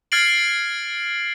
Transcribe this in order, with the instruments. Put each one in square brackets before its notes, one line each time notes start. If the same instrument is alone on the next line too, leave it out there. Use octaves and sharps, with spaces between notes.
[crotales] F6 G#6 A6 C7 D7 F#7